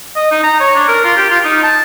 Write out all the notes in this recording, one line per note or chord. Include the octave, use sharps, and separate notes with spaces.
D#5
D#4
A#5
C#5
D4
A#4
F4
G4
F4
D#4
A5